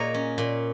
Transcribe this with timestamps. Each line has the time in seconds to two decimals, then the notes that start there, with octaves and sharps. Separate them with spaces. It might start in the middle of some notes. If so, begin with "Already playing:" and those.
Already playing: A#2 A#3 G#4 A#4 C#5 D#5
0.14 C#4
0.38 A#2